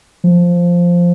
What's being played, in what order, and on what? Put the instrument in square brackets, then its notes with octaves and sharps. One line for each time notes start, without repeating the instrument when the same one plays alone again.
[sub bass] F3